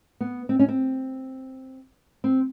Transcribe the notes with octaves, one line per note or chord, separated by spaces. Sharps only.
B3
C4
C#4
C4
C4